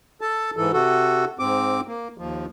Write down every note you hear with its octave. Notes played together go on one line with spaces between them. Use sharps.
A4 A5
G#2 E3 A4
C3 F#4 A4
G#2 C4 D6
A#3
D#2 F3